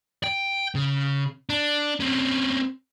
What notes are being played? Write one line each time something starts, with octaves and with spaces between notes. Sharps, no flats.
G5
C#3
D4
C4 C#4